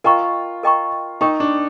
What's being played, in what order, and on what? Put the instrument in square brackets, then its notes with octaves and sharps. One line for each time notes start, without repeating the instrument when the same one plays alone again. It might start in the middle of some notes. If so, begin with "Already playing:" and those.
[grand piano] F4 [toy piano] A#4 D#5 G5 A#5 C#6
[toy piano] A#4 D#5 G5 A#5 C#6
[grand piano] D#4 [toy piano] A#4 D#5 G5 A#5 C#6
[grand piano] D4